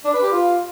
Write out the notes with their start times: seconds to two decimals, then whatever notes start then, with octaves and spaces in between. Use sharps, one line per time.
0.05 D4
0.14 B4
0.23 G4
0.31 F4